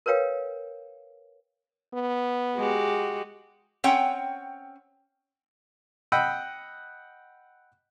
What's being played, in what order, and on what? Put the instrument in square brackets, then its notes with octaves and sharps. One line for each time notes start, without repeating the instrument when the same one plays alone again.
[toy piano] A#4 B4 C#5 F5 G5
[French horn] B3
[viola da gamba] G#3 F#4 G4
[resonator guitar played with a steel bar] C4 C#4 C#5 F#5 G5
[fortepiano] D#5 F#5 G5 B5 E6